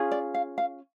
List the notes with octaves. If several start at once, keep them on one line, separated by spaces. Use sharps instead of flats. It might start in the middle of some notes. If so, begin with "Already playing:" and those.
Already playing: C#4 F4 G#4
D5
F5
F5